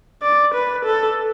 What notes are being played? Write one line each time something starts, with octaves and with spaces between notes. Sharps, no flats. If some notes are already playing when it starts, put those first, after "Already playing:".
D5
B4
A4